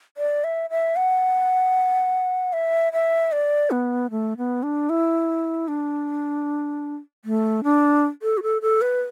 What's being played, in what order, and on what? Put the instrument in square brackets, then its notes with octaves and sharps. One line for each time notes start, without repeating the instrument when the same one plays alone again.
[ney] D5
E5
E5
F#5
E5
E5
D5
B3
A3
B3
D4
E4
D4
A3
D4
A4
F#4
A4
A4
B4